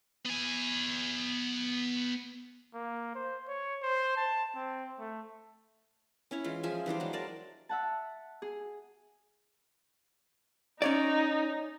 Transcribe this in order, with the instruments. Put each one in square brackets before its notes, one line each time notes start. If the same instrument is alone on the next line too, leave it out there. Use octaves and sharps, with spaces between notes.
[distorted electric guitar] B3 G#5
[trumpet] A#3
C5
C#5
C5
A5
C4
A3
[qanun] C#4 E4 C#5
E3 G#3 F4
F3 G#4 E5
E3 G3 D4 C5
F#3 G#3
A#4 D5 A5
[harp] E5 F#5 A5
G#4
[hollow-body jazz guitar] C#4 C#5 D5 [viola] D#4